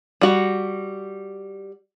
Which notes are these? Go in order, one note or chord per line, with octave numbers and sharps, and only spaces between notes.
G3 F#4